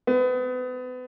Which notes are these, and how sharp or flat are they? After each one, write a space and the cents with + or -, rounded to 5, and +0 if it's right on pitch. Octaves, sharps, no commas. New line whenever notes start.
B3 +35